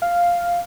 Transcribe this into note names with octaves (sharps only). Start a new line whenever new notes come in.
F5